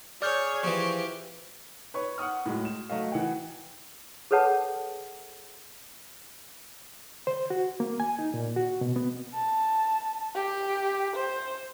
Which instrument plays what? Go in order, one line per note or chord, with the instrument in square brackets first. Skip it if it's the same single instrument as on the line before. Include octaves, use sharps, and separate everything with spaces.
[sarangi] G#4 [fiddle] C#5 [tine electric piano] D5 F6 G6
[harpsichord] E3 F3 [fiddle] G4 [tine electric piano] C#6
[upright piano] B4 C#5 C#6
F#5 C#6 D#6 F6
A2 F#3 G#3
E7
F#3 A3 D#5 F5
E3 F#5 G5
[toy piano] G#4 A4 B4 C#5 F#5 A5
[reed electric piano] C5
F#4
A#3
G#5
D#4
A#2
F#4
B2
B3
[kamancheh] A5
G4
C5